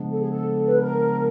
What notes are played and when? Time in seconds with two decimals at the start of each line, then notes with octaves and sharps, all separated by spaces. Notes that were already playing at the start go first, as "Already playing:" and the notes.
Already playing: C#3 F3 G#3 B3 D4
0.11 A4
0.20 G#4
0.30 A4
0.67 B4
0.79 A#4